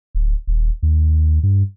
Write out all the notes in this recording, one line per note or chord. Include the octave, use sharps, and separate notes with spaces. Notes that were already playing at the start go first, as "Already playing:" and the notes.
D1
D#1
D#2
G2